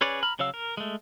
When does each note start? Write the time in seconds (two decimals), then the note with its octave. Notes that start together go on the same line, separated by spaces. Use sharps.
0.01 C#4 G#4 B4 C#5 D5
0.23 A#5 B5 F6
0.39 C#3 F#3 C#5 F5 E6
0.54 A#4
0.77 G#3 A3